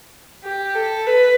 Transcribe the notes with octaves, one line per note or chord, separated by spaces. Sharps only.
G4
A4
B4